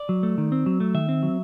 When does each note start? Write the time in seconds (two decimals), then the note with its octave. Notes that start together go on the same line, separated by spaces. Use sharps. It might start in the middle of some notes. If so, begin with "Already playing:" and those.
Already playing: D5
0.09 F#3
0.23 A3
0.38 D#3
0.52 C4
0.66 F#3
0.80 A3
0.94 D#3 E5
1.09 C4
1.23 F#3